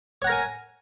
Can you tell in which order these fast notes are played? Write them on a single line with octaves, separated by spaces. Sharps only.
C#5 F#5 A#5 A#4 G#5